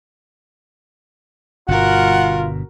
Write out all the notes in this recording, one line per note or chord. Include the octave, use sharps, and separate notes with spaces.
G1 G2 B2 F4 F#4 A#4 F#5